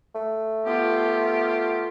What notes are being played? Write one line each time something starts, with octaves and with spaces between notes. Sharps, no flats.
A3
B3 F4 G4